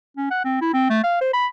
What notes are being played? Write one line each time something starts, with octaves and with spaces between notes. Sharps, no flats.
C#4
F#5
C4
E4
C4
A3
F5
C5
B5